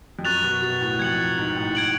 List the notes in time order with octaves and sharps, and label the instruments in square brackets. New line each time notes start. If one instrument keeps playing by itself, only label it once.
[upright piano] F2
[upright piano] F#2 [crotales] C#6 F#6 A6 F7
[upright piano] B2
B2
A2
[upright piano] F2 [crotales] G#6 C#7 F#7
[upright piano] G#2
A2
[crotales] G#6 D7 F#7